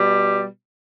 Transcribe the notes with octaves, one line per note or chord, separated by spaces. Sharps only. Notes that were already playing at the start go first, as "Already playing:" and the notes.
Already playing: B2 G3